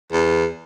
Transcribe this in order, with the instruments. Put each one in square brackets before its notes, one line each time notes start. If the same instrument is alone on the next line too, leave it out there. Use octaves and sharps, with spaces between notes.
[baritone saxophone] E2